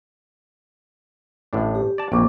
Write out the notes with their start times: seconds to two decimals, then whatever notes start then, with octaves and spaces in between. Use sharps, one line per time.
1.53 A1 A2 D4
1.75 G4
1.98 D5 A5
2.12 A#1 F2 A#3 C#6 D6